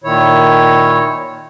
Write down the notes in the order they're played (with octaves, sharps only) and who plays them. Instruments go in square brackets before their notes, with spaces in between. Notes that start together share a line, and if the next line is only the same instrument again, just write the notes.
[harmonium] A#2 D#3 E4 C#5